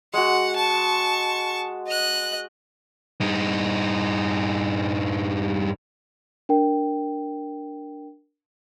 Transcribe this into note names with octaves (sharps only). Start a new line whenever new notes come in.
G#3 F#4 F#5
A5 C#6
D#5 F#6
G2 D#4
D4 A#4 G5